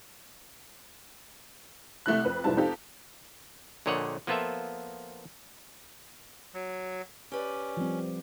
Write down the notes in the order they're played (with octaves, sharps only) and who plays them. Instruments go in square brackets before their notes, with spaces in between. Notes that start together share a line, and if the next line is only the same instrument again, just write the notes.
[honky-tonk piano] C2 A3 E4 F#6
F2 B4
F1 G#2 F3 G3 E4 A5
C4 D#4 F4 G4 A4
[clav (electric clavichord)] A#1 A#2 D3 C#5 D#5 F#5
F3 A#3 B3 F4 A4 E5
[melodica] F#3
[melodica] C#4 [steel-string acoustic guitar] G4 B4 D5
[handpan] F3 G3 C4